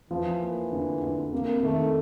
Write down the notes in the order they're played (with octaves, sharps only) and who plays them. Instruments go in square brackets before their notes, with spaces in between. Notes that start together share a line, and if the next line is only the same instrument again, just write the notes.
[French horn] E3 [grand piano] F3
[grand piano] A#3
D3
D3
[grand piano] C3 [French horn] A#3
[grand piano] D#3 [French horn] A3